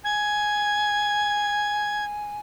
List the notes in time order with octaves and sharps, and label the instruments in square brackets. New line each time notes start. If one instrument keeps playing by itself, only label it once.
[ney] G#5 [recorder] G#6